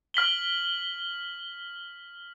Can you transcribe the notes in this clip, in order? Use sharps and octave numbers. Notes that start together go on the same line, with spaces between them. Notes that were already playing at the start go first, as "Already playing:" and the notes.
F6 B6 F#7 G7